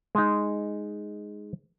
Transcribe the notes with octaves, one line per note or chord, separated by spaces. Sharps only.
G#3 D#4